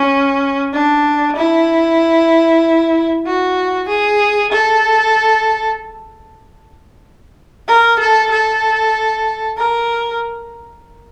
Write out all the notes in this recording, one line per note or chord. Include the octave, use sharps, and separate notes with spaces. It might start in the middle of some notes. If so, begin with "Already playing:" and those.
Already playing: C#4
D4
E4
F#4
G#4
A4
A#4
A4
A4
A#4